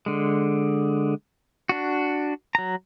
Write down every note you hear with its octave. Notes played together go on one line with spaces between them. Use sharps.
D3 G#3
D4 F#4
F#3 A#5